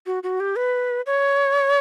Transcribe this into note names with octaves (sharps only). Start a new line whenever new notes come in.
F#4
F#4
G4
B4
C#5